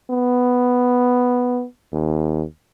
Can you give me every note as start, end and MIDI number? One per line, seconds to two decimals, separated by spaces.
0.10 1.64 59
1.92 2.43 39